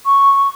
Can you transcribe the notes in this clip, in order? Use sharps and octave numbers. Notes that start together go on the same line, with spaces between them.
C#6